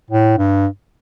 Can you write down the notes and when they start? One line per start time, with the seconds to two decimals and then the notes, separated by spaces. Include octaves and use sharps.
0.10 A2
0.38 G2